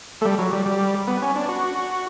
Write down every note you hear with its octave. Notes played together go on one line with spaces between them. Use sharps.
A3
G3
F#3
G3
G3
B3
C#4
D4
F#4